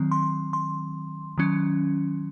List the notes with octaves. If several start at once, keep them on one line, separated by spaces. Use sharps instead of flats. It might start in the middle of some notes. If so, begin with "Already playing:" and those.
Already playing: D#3 F#3 C4
C6
C6
D#3 F#3 C#4